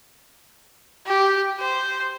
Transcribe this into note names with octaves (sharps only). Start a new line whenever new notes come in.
G4
C5